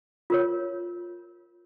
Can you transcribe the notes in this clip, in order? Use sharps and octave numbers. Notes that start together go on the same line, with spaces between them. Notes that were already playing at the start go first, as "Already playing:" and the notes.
F4 A#4 C#5